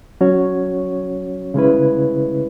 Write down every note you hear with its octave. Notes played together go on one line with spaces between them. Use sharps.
F#3 C#4 F#4 C#5
C#3 G#3 C#4 E4 B4